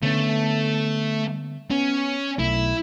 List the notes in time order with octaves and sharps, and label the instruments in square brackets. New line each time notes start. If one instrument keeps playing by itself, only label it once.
[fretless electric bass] D3 B3 C#4 [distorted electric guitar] A3
[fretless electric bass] B3 [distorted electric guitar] C#4
[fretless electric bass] B1 A3 [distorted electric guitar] E4